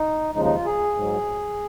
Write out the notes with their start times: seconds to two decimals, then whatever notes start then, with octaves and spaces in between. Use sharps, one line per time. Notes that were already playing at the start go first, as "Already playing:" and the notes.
Already playing: D#4
0.34 D#2 C#3 F3 G#3 D#4
0.45 D#4
0.55 F4
0.66 G#4
0.96 G#2 F#3